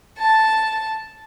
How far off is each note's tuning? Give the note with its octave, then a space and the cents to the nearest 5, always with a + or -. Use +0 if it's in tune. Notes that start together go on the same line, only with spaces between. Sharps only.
A5 +0